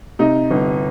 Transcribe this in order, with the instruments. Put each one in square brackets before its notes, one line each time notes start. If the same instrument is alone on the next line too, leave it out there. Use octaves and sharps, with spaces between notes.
[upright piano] C3 D#4
G1